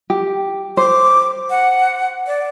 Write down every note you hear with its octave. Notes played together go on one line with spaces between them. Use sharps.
G4
C5 D6
F#5
D5